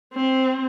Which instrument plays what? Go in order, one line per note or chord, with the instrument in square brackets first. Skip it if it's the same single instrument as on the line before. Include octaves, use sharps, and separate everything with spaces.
[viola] C4